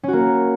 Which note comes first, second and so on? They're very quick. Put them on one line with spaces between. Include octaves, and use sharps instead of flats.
C#4 F#4 A#3